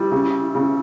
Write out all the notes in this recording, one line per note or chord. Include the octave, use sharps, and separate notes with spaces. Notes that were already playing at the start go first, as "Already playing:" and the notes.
Already playing: G3 E4
C#3
C#3